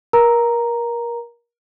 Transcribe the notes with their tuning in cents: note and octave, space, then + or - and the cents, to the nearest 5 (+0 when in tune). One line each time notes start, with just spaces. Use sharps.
A#4 +25 A#5 +0